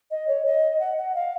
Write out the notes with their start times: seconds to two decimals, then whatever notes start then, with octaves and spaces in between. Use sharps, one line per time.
0.11 D#5
0.28 C#5
0.45 D#5
0.80 F#5
0.98 F#5
1.15 F5